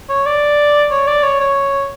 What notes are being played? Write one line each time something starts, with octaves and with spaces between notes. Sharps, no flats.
C#5
D5
C#5
D5
C#5
C#5